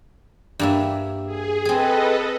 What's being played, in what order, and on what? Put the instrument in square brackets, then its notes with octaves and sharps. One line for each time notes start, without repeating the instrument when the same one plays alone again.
[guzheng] G2 A#3 E5
[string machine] G#4
[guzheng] C4 G#4 [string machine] A4 B4 D#5